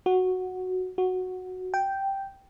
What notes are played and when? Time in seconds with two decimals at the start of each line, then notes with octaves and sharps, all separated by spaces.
0.06 F#4
0.98 F#4
1.74 G5